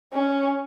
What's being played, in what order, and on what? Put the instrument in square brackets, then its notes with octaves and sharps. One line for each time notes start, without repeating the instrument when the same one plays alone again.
[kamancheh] C#4